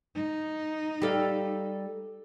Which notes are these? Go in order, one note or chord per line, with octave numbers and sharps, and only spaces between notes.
D#4
G3 A4 F5